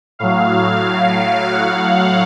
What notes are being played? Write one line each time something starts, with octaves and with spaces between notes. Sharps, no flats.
A2 F#3 F5
F#5
F5